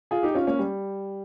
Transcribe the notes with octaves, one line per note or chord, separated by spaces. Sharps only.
F4 G#4
D#4 G4
C#4 F4
A#3 C#4
G3